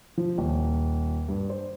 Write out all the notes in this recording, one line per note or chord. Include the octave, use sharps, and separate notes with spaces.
F3
D#1
G2
C5